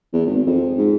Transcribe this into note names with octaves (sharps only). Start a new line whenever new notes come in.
E2
G#1
F2
G#2